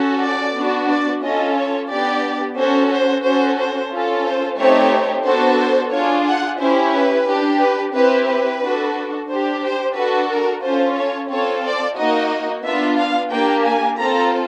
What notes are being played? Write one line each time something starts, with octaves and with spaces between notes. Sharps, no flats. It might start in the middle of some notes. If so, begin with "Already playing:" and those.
Already playing: C#4 F#4 A4
D5
B3 D4 F#4
D5
C#4 F4 A4 D#5
C#5
B3 D4 G4 D5
C#4 F#4 A4 C5
C5
C#4 F#4 A4 C5
C5
C#4 F4 A4
C5
A3 C4 D#4 G4 C#5
B3 D4 F#4 A4 C5
C5
D4 F4 G#4 C#5
F#5
C#4 E4 G4 C5
B4
D4 G4
B4
C4 E4 G4 B4
B4
D4 F#4 A4
D4 G4 C5
C5
D4 F#4 A4 B4
A#4
C#4 F4 A4 C5
C#5
C4 F4 A4 C#5
D5
A#3 D#4 F#4 D#5
B3 D4 F4 E5
F5
A#3 D4 G4 G5
G#5
C4 F4 A4 A#5